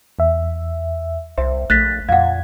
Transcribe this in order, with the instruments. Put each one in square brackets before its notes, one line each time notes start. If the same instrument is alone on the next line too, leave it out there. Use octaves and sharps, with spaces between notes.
[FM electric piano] E2 E5
[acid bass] C2 [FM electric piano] C5 [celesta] E5
[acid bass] A#1 [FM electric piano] A3 [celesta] F#6 A6 B6
[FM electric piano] F2 G#6 [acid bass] A#2 [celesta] F5 F#5